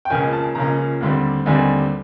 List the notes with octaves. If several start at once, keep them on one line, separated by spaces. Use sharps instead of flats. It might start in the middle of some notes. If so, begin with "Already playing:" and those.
G5
C#2 C#3 F3 A#3 C#4 G#5
A5
C#2 C#3 F3 A#3 C#4 A#5
D#2 D3 G3 C4
D#2 D3 G3 C4 G#5